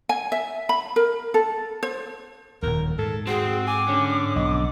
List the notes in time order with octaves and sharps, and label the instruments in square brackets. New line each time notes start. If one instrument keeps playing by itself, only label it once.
[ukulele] G#5
E5
B5
A#4
A4
C5
[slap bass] D#1 D#2 [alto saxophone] A#4
[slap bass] G#2 [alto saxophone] A4
[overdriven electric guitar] C4 G5 [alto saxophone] F#4 [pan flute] G#4
[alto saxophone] G#5 [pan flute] D6
[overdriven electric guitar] D3 [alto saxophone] C#4
[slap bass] B1 [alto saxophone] D#5